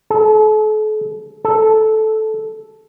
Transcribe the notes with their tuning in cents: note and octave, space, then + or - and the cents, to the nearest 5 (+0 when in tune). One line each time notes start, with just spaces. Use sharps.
A4 -40
A4 -10